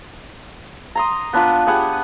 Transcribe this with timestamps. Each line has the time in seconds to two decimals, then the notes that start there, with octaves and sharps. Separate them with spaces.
0.95 A#5 C6 D#6
1.33 B3 D4 F4 B4
1.67 B3 G4 G#4 F#5